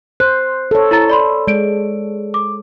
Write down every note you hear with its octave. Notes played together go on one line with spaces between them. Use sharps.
C5 F#6
A4 C#5
E4 A#5 A6
D5 B5 C6
G#3 D5 D7
D6